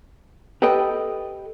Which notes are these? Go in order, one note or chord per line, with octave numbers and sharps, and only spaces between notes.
G4 A4 B4 D#5 G5